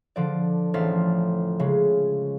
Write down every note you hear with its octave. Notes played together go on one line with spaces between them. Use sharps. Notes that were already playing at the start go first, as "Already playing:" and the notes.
D3 F3 D5
A1 F3 F6 A6 B6
C#3 G#3